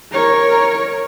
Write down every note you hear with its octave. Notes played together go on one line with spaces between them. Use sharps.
A#4 C#5